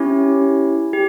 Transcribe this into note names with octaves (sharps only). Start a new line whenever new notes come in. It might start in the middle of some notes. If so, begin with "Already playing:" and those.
Already playing: C#4 E4 G4 C#5
G4